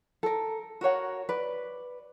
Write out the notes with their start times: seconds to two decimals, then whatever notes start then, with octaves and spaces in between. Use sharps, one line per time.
0.23 A4 A#4
0.81 F#4 A#4 C#5 F#5
1.29 B4 D5